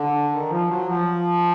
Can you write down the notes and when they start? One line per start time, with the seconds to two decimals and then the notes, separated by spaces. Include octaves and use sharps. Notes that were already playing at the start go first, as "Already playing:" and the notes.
Already playing: D3
0.32 D#3
0.50 F3
0.68 F#3
0.86 F3